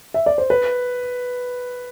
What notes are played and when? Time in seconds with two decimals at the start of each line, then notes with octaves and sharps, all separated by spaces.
0.14 E5
0.26 D5
0.38 C5
0.50 B4